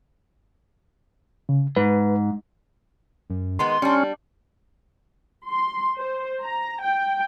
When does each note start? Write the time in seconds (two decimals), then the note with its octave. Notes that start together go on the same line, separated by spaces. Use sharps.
1.49 C#3
1.76 G#2 B4
3.30 F#2
3.59 D#3 G#3 B3 C6
3.82 G3 C#4 D4
5.47 C6
5.97 C5
6.41 A#5
6.80 G5